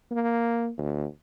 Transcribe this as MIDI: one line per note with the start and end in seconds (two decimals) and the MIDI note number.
0.11 0.70 58
0.78 1.06 38